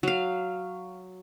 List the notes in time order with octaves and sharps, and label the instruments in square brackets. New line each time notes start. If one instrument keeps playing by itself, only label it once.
[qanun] F#3 F5